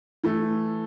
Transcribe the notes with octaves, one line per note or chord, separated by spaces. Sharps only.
E3 A3